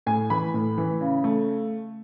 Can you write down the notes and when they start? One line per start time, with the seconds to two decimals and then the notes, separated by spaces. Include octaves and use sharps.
0.06 A2 G#5
0.30 E3 B5
0.54 A2
0.78 E3
1.01 C#3
1.24 A3